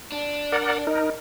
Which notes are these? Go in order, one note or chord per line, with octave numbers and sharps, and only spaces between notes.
D4
A#4 D5 F#5
D#4 A#4 D#5